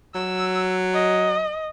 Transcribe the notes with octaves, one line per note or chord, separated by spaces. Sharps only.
F#3 E6
D#5